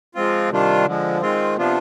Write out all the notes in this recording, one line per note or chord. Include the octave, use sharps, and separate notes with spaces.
F3 G#3 C4 F4
C3 D#3 G3 D4 F4
D3 F3 G#3
D#3 G#3 C4 F4
C3 F3 B3 D4 F4